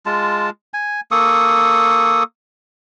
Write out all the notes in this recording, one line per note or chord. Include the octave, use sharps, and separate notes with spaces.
G#3 F4 A5
G#5
A#3 A4 C#6 D#6